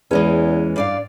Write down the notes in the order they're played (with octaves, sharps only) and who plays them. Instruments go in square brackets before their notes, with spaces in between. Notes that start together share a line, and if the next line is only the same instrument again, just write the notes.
[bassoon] E2 [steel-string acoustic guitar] E3 G#3 C#4
[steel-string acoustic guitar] G2 D5 F5